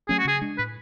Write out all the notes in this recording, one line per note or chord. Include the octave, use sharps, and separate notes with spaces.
F#3 A3 C#4 G#4
F#4
C#3 G#4
G#3 D4
A2 B4